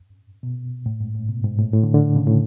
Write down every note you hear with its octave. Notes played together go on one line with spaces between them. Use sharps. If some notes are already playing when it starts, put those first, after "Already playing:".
B2
A2
G#2
A2
B2
G#2
A2
A2
D3
D3
C#3
A2